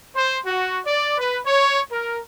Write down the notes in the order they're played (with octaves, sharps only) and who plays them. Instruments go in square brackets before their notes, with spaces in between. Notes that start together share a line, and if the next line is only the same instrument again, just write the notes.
[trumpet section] C5
F#4
D5
B4
C#5
A#4